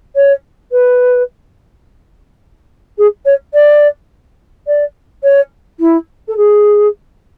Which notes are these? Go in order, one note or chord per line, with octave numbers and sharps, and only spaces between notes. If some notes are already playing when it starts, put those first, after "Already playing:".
C#5
B4
G#4
C#5
D5
D5
C#5
E4
A4
G#4